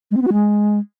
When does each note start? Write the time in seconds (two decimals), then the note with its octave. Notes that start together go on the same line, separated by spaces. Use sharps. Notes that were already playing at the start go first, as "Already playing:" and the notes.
0.11 G#3
0.16 C4
0.22 B3
0.27 F#4
0.33 G#3